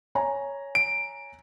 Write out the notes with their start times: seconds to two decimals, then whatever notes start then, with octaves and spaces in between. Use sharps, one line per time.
0.15 C#5 G#5 A#5
0.75 D7